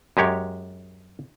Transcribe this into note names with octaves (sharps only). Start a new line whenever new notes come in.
F#2 G#3 G4 C#5